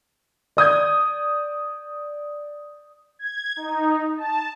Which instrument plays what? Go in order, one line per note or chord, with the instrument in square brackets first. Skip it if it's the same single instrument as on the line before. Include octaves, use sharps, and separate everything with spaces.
[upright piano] D5 D#6 G6 G#6
[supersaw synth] G#6
D#4
A5